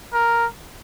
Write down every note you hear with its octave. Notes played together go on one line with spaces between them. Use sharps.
A#4